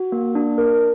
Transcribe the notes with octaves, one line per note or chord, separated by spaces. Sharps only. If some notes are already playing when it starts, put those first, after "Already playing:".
Already playing: F#4
A#3
D4
A#4